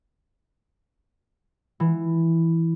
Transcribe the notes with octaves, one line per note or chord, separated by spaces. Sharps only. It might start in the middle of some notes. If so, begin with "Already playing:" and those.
E3